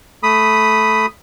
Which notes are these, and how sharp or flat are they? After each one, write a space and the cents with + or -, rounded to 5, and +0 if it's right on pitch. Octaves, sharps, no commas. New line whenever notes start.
A3 -10 B5 +0 D#6 +0